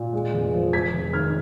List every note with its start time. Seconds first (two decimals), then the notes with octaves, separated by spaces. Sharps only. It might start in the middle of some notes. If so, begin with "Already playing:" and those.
Already playing: A#2
0.13 G#3
0.34 F1
0.54 F3
0.73 G#3 G#6 B6
0.93 F1
1.13 D#3 F6 G#6